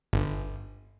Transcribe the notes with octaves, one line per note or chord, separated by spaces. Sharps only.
G1